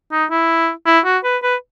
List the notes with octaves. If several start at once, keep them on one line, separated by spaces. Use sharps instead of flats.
D#4
E4
E4
F#4
B4
B4